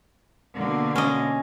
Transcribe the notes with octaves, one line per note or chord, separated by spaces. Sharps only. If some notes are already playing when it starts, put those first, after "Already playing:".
B2 D3 A#3
C#4 D#5